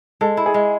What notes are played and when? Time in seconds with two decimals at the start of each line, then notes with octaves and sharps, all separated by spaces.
0.21 G#3 A4
0.37 E4
0.46 G#4
0.54 G#3